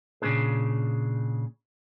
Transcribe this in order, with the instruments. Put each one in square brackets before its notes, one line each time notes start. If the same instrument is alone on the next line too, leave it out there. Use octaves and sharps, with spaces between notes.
[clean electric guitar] A#2 C#3 A#3 C4 D4 G#4